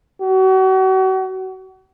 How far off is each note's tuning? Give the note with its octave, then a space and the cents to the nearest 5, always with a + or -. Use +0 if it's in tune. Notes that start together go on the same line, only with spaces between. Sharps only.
F#4 +35